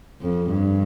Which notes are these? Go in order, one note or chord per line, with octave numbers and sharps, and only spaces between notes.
F2
G2